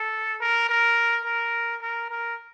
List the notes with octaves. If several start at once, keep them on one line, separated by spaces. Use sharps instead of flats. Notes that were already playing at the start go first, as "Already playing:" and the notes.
Already playing: A4
A#4
A#4
A#4
A#4
A#4